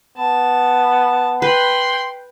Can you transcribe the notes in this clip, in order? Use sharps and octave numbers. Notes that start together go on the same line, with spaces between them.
B3 A5
B4 G5 B5 C6